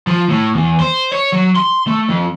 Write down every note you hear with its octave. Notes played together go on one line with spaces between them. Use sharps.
F3
A2
E2
C5
C#5
F#3
C6
A3
F2